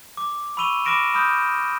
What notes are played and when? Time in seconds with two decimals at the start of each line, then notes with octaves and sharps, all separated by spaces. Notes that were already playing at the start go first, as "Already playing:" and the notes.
0.17 D6
0.57 B5 C#6 E6 D#7 F7 G7
0.85 B5 D6 F6 A#6 D7 E7
1.14 B5 D#6 F6 G6